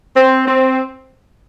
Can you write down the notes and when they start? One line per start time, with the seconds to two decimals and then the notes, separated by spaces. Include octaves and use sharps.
0.16 C4
0.47 C4